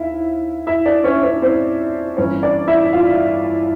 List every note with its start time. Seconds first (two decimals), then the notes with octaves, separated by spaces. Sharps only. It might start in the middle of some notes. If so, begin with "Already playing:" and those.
Already playing: D#2 E4 E5 F5
0.67 E4 E5
0.85 D4 D5
1.04 C#4 C#5
1.23 C#4 C#5
1.42 C4 C5
2.17 G1 G2 E3 C#4 C#5
2.43 D4 D5
2.68 E4 E5
2.93 F4 F5